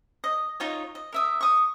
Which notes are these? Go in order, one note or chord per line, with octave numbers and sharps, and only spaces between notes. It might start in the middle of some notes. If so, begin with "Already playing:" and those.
D#5
D#4 F4 C#5
D#5
A#4 E5 D#6
C#6 D#6